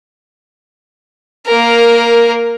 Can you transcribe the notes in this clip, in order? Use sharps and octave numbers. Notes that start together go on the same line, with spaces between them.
A#3 A#4